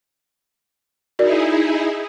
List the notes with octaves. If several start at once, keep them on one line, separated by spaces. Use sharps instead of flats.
D#4 E4 F#4 G#4 A#4 D5